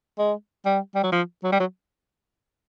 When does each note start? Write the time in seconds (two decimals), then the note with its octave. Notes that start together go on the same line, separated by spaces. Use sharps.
0.19 G#3
0.65 G3
0.95 G3
1.03 F#3
1.12 F3
1.44 F#3
1.52 G3
1.60 F#3